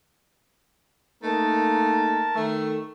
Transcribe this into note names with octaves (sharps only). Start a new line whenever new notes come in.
A3 A#3 D#4 A#4 A5
D#3 A3